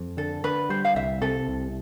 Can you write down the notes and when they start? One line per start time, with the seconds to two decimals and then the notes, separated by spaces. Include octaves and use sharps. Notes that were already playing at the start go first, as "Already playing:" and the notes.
Already playing: F2
0.17 D3 A4
0.44 D3 B4
0.70 G3 C5
0.85 F5
0.95 C2 E5
1.22 C3 A4
1.48 C2